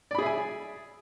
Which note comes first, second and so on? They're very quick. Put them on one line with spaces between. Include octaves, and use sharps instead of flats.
D5 B5 G#4 E5 G#5